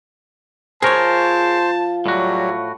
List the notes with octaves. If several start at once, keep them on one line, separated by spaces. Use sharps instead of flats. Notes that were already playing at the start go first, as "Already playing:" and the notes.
F3 F4 G#4 A#4 C5 C#5 A5
A2 F#3 G3 F#4